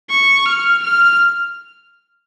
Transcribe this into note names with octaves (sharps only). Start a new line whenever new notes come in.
C#6
F6
F6